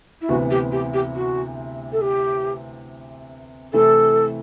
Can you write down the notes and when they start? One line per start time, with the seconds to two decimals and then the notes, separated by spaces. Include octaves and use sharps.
0.21 E4
0.29 D2 C3 E3 B3 F#4
0.50 G4
0.71 G4
0.93 G4
1.15 F#4
1.92 A4
2.01 G4
3.73 C3 E3 A3 E4 A4